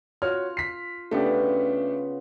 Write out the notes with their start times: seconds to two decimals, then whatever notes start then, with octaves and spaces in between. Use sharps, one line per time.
0.22 F4 F#4 C#5 F6
0.57 B6 C7
1.11 C#3 A3 B3 D4 G4